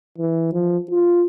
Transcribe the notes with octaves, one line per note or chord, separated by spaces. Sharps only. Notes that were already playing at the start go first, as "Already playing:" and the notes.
E3
F3
F4